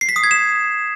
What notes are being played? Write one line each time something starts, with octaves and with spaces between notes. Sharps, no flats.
C7
B6
D#6
G#6
E7